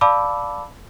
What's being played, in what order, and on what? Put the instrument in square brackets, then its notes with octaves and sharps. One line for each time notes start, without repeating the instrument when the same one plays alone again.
[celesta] D5 F5 A5 B5 D6 E6